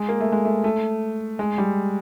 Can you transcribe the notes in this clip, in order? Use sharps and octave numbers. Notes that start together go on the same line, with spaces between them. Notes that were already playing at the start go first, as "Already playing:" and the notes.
Already playing: G#3
A#3
A3
G#3
A3
A3
G#3
G3